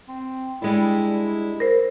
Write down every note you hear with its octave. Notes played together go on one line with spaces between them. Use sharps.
C4
G3 G#3 D4 E4
A#4 C5